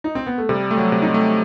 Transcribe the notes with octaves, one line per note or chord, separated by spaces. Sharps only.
D#4
C4
B3
A3
C3 G3
A3
F#3
C3
D#4
C4
A3